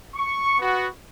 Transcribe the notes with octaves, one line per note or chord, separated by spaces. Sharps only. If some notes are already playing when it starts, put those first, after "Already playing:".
C#6
B3 F#4